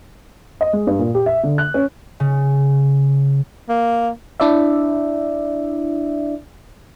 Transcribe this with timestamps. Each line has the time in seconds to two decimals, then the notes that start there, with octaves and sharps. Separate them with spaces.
0.61 D#5
0.73 G#3
0.87 G2
0.99 A#2
1.15 G4
1.26 E5
1.43 D3
1.58 F#6
1.74 C#4
2.20 C#3
3.68 A#3
4.40 D4 E4 D5 E5